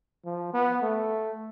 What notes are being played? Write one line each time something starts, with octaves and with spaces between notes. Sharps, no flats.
F3
B3
A3